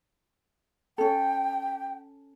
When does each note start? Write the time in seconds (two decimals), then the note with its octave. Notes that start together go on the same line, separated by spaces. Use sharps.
0.98 C#4 A4 G5